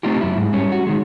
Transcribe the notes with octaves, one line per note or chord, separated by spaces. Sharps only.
A3 C4 D#4 F4 G4
F#2 E4
G#2
G3 C#4
F#4
D#3 G#3